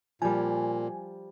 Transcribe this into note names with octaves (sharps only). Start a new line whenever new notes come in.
A#2 F3 G3 G#5